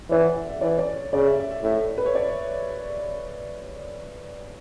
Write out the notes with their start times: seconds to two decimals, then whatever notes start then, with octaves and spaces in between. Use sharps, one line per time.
0.10 E3 D5
0.23 F#5
0.36 E5
0.49 E5
0.61 E3 D5
0.78 D5
0.96 C#5
1.13 C#3 D5
1.25 E5
1.39 E5
1.51 E5
1.63 A2 E5
1.98 B4
2.06 C#5
2.15 D5